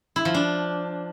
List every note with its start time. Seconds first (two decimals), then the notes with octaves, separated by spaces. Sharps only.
0.16 E4
0.25 F3
0.34 D4